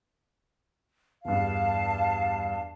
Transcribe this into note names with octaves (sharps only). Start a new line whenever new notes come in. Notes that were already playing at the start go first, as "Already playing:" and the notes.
E2 G2 F5 A5